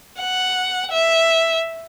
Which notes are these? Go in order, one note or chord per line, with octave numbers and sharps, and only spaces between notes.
F#5
E5